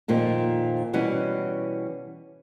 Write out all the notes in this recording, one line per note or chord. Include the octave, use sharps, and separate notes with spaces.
F2 A#2 D#3 F3
B2 E3 G3 C#4 F#4 F#5